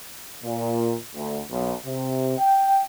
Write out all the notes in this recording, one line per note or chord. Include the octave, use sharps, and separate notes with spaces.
A#2
D2
B1
C3
G5